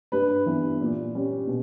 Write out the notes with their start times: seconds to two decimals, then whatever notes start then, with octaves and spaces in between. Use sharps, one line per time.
0.12 G2 B4
0.46 E3 B3
0.81 A#2
1.15 G3 C#4
1.47 B2